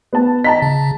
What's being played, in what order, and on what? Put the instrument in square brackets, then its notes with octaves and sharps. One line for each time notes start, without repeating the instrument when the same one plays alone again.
[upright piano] B3 A5
[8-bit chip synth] D#5 [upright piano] A5 A#5 B6
[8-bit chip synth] C#3